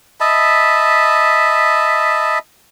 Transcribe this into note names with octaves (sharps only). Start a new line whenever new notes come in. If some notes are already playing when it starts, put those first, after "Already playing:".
D#5 E5 A5 B5